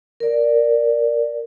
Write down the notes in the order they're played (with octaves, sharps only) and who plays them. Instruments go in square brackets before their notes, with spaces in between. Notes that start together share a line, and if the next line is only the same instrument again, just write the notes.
[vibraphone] A#4 D5